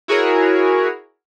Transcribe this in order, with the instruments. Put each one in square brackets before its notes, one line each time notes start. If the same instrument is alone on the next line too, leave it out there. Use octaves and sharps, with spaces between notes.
[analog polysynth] E4 F#4 G#4 A#4 C#5